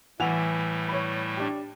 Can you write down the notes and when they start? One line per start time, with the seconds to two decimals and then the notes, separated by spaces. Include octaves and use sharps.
0.20 A2 E3 G3 A3 F#5 F7
0.89 C#5 B5
1.37 D4 G4